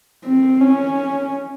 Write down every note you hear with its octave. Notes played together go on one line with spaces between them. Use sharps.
C4
C#4